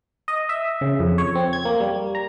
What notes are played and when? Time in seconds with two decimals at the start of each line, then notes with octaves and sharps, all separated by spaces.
0.28 D#5
0.49 E5
0.81 C#3
1.00 F2
1.18 C#5
1.35 C4
1.53 G#6
1.65 A#3
1.80 G3
2.15 A#5